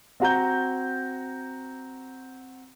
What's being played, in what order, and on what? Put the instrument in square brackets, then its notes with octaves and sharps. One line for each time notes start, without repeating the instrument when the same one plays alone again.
[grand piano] C4 F#4 A#5 G6